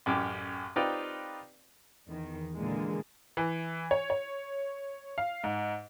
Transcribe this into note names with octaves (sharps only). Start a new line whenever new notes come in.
A1 F#2 G4 D6
C4 D#4 F4 G4 B4 D5
E2 D#3
A#2 D3 E3 G#3 A#3
E3
C#5
C#5
F5
G#2